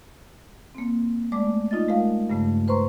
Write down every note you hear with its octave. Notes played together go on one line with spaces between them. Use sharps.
A#3 C4
G#3 A3 D5 D6
D#4 F4 D#5 A6
G#3 A3 F4 A#4 F5
G2 C#3 A3
B4 C5 A#5 C6 C#6